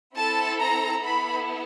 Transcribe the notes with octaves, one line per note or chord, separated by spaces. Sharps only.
C4 E4 A4 A5
A#5
B3 E4 A4 B5